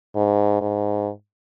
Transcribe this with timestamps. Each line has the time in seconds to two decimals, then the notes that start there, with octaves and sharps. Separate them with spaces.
0.16 G#2
0.61 G#2